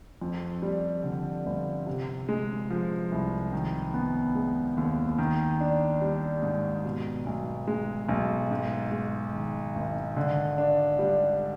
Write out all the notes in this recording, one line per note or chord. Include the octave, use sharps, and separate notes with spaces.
F2
G3
D3
G1
C3
G#3
F3
C2
D#3
B3
G#3
D#2
D#3
D4
G3
G#2
B2
B1
G#3
B1
G#2
G#3
D#3
G#1
D3
D4
G3